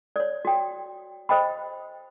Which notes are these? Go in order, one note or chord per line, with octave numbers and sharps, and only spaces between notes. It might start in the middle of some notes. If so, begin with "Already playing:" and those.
C#5 D5
F#4 G5
C5 D#5 G5 B5